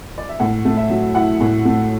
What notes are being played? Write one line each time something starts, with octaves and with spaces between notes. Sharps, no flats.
D5
E5
A2 F#5
A3
E5
F#3
E4 F#5
A2
A3